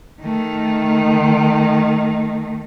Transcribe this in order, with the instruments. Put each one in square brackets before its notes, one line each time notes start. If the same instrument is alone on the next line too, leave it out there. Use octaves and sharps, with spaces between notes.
[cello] D#3 A3